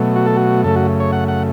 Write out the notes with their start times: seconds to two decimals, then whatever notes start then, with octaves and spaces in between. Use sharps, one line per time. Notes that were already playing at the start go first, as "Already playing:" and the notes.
Already playing: B2 F#3 A3
0.16 F#4
0.26 A4
0.37 F#4
0.64 F#2 C#3 A3 A4
0.76 F#4
1.00 C#5
1.12 F#5
1.28 F#5